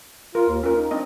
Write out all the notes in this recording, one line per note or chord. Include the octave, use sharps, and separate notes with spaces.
F4 A#4
D#2
C#4 F4 A#4
D#4
C4 D4 D#5